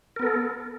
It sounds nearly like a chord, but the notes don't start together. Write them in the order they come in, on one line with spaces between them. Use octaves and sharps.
A#4 B3 A4